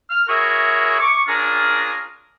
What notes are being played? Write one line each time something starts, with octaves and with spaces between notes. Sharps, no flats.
F6
E4 F#4 G#4 A#4 C#5 E5
C#6 D6
C#4 D4 F4 G#4 A#4